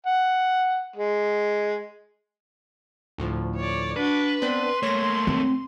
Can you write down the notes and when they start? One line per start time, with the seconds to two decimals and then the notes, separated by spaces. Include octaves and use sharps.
0.07 F#5
0.96 G#3
3.18 D2 A2 F3
3.56 C#5 D5
3.96 D4 F#4 B4
4.42 B3 C4 D4 C6
4.83 A3 A#3 C#5 A#6
5.27 C4